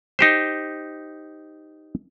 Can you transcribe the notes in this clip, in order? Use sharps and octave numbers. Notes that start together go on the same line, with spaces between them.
D#4 G4 C5